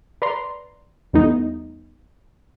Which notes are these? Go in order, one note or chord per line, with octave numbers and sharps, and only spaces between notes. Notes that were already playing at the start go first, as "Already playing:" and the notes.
B4 D5 A#5 C6
E2 G3 A3 B3 D#4